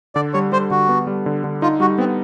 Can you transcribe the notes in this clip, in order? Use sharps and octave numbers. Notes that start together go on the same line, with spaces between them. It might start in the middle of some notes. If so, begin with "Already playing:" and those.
D3 D5
G3 C#5
G3 C5
D3 F#4
B3
G3
D3
D3
D#4 F4
G3 F#4
B3 C4